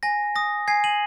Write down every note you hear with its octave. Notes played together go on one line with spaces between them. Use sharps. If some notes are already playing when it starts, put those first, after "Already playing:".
G#5 A#6
D#6 A#6
G#5 G#6 C7
D#7 F#7